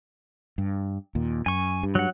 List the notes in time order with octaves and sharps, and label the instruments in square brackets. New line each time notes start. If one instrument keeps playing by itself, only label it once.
[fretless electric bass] G2
D#2 A#2
[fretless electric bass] F#2 [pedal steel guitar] G#5 C#6
[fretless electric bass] G2
[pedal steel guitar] F#3 F#5